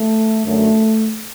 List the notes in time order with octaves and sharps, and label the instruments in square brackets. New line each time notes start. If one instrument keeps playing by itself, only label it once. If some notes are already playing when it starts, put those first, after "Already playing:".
Already playing: [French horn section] A3
F#2 D3 F#3 A3